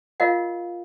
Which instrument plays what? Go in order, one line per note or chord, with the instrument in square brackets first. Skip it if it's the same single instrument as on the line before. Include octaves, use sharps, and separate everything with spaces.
[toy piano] F4 A#4 D#5 F5 F#5